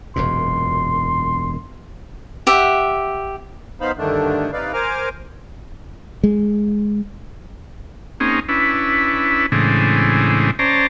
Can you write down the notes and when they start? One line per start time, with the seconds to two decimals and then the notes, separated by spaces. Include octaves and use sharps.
0.16 E1 F#2 A#2 C6
2.47 G4 E5 F#5
3.81 B3 D#4 C5 F5 B5
3.98 G2 D3 D#3 A3 D4
4.53 C3 D#4 B4 D5 F5
4.73 A#4 C5 G#5 A#5 D6 F6
6.24 G#3
8.20 A#3 C4 C#4 D#4 G#4
8.49 C#4 D4 E4 B4
9.52 A2 C#3 E3 G#3 C4 D4
10.59 C#4 C5 D5 A5 A#5